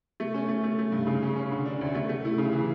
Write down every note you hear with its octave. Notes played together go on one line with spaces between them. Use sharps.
A3
C#4
A3
A3
A3
G2
C#3
C#4
C#4
D3
D4
D2
A3
A3
E4
C#3
E3